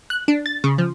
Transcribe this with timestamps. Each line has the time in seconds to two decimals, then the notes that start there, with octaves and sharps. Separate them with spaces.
0.10 F#6
0.28 D4
0.46 A6
0.64 C#3
0.78 F3